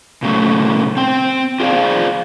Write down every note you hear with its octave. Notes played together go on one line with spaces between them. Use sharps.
A#2 C#3 F#3 A3
C4 G5
F4 G#4 C5 D5 F5